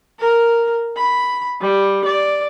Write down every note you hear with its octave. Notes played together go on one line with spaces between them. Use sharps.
A#4
B5
G3
D5